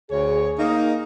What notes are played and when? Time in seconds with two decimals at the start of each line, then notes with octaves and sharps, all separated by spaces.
0.11 D2 G#4 C#5
0.57 A#3 D#4